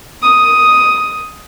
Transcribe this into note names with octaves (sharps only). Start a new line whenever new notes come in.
D#6